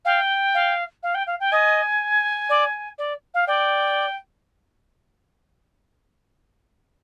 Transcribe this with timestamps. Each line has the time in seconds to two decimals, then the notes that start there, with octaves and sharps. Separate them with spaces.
0.05 F5 G5
0.54 F5
1.03 F5
1.14 G5
1.27 F5
1.40 G5
1.52 D#5 G#5
2.49 D5
2.98 D5
3.34 F5
3.47 D5 G5